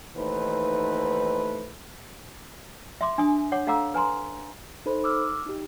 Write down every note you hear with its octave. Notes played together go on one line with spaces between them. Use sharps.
D#2 E3 A3 D#4 B4 C5
E5 C6 D6
D4 G#5 D#6
C#5 F#5 D6
A4 F5 F#5 A#5 D6 E6
B4 G#5 A#5 C6
D#4 A4 C5 B5
D6 E6 F6
D#4 G4